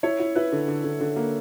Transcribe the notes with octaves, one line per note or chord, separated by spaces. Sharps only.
E4 C#5
E4
E4 B4
D3
D3
D3
D3
A#3